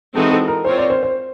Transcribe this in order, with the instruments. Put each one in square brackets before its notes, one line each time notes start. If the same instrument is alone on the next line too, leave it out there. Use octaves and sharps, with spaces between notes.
[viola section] E3 G#3 C4 D#4 F#4 [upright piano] A4
[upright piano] A4
A#4
[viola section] C4 F4 A#4 C#5 [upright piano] C5
[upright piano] D5
C5
C5